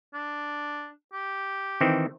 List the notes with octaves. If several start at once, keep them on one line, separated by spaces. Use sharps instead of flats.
D4
G4
D#3 E3 C4